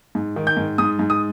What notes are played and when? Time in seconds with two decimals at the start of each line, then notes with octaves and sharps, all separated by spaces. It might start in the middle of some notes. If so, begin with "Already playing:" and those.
0.15 G#2
0.36 D#3
0.47 G6
0.57 G#2
0.78 G#2 D#6
0.99 G#2
1.10 D#6